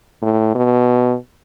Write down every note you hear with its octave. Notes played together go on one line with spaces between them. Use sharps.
A2
B2